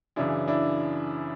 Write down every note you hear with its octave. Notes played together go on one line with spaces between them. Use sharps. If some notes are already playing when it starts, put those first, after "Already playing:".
F#2 C#3 E3 D4 E4
D4 E4